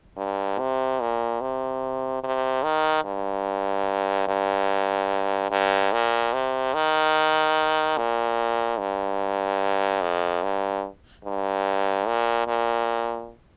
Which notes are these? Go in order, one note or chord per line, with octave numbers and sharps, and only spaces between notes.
G2
C3
A#2
C3
C3
D#3
G2
G2
G2
A#2
C3
D#3
A#2
G2
F2
G2
G2
A#2
A#2